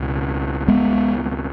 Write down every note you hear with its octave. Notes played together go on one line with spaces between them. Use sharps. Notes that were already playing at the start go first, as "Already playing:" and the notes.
Already playing: C#2 B2
G#3 B3